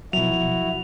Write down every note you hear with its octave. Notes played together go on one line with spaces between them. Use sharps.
B2 F3 F#3 E4 F#4 F7